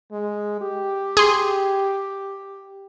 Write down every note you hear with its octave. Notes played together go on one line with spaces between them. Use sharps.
G#3
G4
G#4 C6